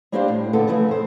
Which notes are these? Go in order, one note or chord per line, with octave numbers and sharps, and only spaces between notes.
G3 A#3 D4 G4 C5 F5
A2
A#2 D3 B3 A4
C#3 E3 F3 A3
F2 C5